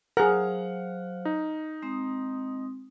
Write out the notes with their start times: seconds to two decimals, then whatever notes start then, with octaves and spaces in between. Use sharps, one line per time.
0.17 F#3 G#4 A#4 C5 F5 F#5 F6
1.25 D#4
1.82 G#3 C4 D#6